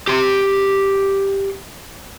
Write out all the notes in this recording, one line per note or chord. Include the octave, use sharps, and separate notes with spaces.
G4 C6